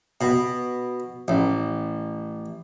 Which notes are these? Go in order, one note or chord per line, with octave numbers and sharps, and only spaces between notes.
B2
A1